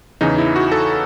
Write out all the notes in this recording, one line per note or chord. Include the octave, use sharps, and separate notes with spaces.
E2 C#3 E3 D#4
E4
F#4
A4